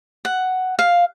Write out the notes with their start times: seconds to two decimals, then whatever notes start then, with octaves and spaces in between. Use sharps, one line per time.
0.25 F#5
0.79 F5